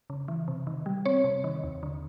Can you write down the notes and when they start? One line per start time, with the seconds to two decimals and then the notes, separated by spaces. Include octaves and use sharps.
0.10 C#3
0.28 E3
0.48 C3
0.67 D#3
0.86 G3
1.06 C4 C#5
1.24 C3
1.44 D#3
1.64 D#2
1.83 D3